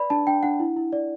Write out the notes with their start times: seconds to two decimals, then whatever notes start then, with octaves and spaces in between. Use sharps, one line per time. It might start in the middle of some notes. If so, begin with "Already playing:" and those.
Already playing: B4 D5 B5
0.10 D4 A5
0.27 D4 G5
0.43 D4 F#5
0.60 E4
0.77 E4
0.93 D5